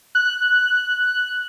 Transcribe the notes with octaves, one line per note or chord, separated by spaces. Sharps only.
F#6